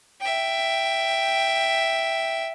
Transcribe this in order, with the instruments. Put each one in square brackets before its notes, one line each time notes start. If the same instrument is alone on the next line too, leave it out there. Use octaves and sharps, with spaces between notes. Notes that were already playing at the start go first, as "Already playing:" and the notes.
[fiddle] E5 G5